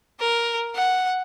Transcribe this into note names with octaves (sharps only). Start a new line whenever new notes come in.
A#4
F#5